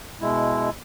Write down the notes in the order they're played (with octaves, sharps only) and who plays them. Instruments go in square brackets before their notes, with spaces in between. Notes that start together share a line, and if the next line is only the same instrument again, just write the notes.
[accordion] B2 G#3 E4